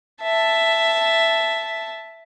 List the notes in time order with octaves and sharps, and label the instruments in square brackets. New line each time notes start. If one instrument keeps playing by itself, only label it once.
[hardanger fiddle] E5 A5